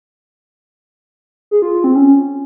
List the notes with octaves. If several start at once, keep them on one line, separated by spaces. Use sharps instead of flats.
G#4
F4
F4
C4
C#4